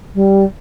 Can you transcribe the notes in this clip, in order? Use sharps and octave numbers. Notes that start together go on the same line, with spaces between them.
G3